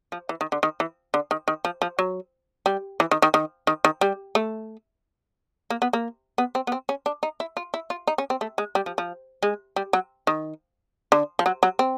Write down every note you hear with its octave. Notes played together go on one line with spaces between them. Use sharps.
F3
E3
D#3
D3
D#3
E3
D3
D#3
D#3
F3
F3
F#3
G3
E3
D#3
D#3
D#3
D#3
D#3
G3
A3
A#3
B3
A#3
B3
C4
B3
C4
C#4
D4
D#4
E4
F4
E4
F4
D#4
C#4
C4
A3
G#3
G3
F3
F3
G#3
G3
F#3
D#3
D3
F3
F#3
F#3
C4